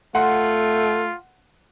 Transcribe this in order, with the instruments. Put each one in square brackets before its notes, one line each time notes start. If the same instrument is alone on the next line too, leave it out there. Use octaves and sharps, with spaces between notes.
[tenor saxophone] A3 [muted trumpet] F4 [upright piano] F#5 C6